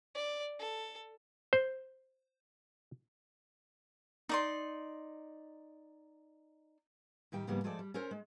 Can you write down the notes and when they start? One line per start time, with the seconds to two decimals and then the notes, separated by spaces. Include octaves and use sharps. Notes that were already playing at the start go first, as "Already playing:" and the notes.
0.15 D5
0.59 A4
1.53 C5
4.29 D#4 D5 C6
7.32 A2 D#3 G3 G5
7.47 G#2 C#3 F3 G3 A#3 B3
7.64 F3 G#3 A3 A4 C5 D5
7.79 G3
7.94 C#4 A4 A#4 C5
8.11 G#3